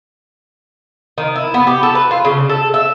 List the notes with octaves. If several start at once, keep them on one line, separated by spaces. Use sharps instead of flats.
D#3
E4
B3
G4
A4
B4
F4
C#3
A4
E5